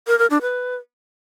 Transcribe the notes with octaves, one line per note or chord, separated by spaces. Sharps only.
A#4
A#4
D4
B4